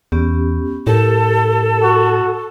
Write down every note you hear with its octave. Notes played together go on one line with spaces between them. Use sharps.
E2 B3 C#4 G4
A2 G4 A4 A#4
F#4